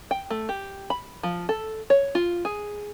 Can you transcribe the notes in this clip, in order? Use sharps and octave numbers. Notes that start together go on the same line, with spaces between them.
G5
A3
G4
B5
F3
A4
C#5
F4
G#4